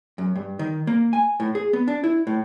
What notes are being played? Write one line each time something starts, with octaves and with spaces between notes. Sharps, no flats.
F#2
G2
D#3
A#3
G#5
A2
G#4
B3
D4
E4
A2